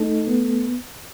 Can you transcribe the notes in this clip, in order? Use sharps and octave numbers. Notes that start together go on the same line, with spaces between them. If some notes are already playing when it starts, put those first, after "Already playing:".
Already playing: A3 D#4 A4
B3